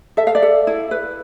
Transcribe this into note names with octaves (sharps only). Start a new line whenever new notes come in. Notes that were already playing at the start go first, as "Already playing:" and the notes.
A4 E5
F5
D5 E5
A4
E4
B4